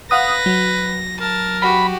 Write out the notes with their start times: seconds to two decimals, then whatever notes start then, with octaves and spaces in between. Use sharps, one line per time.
0.11 B4 F5 F#5 D#6 A#6
0.46 F#3
1.20 A#4 A5
1.62 F#4 G4 B5